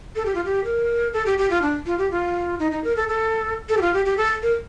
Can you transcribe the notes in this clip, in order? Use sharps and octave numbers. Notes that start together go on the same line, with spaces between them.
A4
G4
F4
G4
A#4
A4
G4
G4
F4
D4
F4
G4
F4
D#4
D#4
A#4
A4
A4
A4
G4
F4
G4
G4
A4
A#4